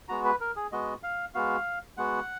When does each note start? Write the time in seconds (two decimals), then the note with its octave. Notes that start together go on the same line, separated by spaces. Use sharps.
0.09 G#3 B3 F#4 A#5
0.25 B4
0.41 A#4
0.56 G#4
0.72 G#3 B3 F#4 D#5
1.03 F5
1.34 G#3 B3 F#4 F5
1.97 G#3 B3 F#4 F#5